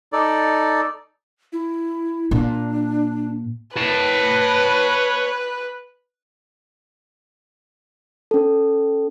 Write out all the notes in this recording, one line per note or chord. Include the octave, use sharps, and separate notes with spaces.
D#4 A4 D5
E4
A#2 D4
B4 C#5 A5
C#4 A4